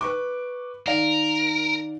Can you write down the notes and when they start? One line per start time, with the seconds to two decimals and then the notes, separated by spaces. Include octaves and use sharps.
0.01 B4 C#6 D6
0.87 D#3 A#4 D5 F5